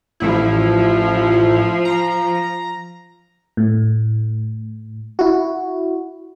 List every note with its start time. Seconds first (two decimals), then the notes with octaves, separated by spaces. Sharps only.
0.20 A1 F3 E4
1.85 A#5
3.57 A2
5.19 E4 F#4